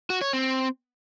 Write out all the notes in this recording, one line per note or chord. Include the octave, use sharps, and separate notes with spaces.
F#4
C#5
C4